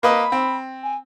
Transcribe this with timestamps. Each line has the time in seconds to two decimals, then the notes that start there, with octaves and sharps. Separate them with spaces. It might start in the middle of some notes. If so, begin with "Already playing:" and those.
0.03 A#3 B4 D#5 B5
0.32 C4
0.83 G#5